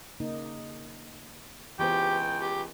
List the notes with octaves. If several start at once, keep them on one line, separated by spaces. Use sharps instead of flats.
C#3 A#3 D#4
C#2 E3 B3 G4 C5 G5
G4